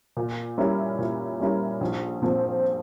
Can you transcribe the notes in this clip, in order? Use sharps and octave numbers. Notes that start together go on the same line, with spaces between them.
A#2
G3 C#4 E4 A#4
A#2
G3 C#4 E4 A#4
A#1
A#2 F3 C4